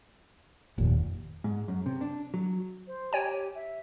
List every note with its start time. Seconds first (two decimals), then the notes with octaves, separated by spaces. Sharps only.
0.78 F1 D#2 A#2
1.44 G#2
1.68 F#2
1.86 C3
2.01 D4
2.34 F#3
2.87 C5
3.13 G4 C#5 G5 G#5
3.55 E5